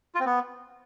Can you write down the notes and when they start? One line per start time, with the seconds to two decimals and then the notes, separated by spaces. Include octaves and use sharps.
0.15 F4
0.20 C4
0.26 B3